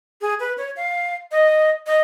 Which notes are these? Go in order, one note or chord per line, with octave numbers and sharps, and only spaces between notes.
G#4
B4
C#5
F5
D#5
D#5